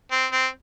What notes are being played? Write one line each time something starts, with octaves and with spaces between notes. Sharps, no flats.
C4
C4